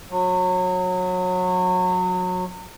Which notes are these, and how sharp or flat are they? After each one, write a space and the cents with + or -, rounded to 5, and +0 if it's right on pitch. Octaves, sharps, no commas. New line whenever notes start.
F#3 -25